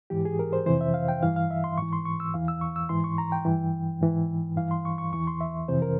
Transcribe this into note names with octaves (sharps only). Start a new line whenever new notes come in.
G#2 E3 G4
G#4
A#4
C5
F2 C3 E3 C5
E5
F5
G5
G2 E3 F5
F5
E5
C6
G#2 E3 C#6
C6
C#6
E6
E2 E3 F5
E6
C#6
E6
G#2 E3 C6
C#6
A#5
G5
G2 E3
G#2 E3
G2 E3 F5
C6
C#6
C#6
E2 E3 C#6
C6
E5
F2 C3 E3 C5
A#4